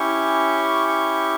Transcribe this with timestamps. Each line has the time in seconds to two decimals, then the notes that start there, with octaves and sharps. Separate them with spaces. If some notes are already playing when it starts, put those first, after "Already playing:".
Already playing: C#4 E4 G4 C#6
0.88 C#6